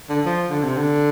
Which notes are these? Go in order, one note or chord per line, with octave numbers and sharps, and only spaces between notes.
D3
F3
D3
C3
D3